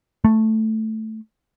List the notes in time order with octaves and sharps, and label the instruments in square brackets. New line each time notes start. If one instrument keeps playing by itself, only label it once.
[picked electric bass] A3